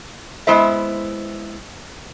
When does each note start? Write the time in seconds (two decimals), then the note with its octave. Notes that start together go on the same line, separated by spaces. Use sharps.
0.47 G#3 B3 E4 C5 E5